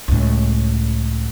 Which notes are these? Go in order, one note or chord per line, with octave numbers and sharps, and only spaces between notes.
C#2 A2